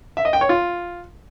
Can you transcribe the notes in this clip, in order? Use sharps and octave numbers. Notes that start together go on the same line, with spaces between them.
E5
D#5
G5
C#5
F4